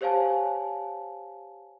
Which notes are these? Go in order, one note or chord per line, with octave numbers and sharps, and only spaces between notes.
G4 C5 C#5 F5 G#5 A5